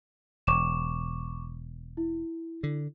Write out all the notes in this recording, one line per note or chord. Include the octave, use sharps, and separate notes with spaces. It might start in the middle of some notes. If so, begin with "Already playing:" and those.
E1 C#6 D6 E7
E4
D3